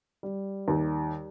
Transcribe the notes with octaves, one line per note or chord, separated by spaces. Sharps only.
G3
D#2